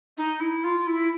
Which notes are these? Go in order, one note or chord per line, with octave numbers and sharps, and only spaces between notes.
D#4
E4
F4
E4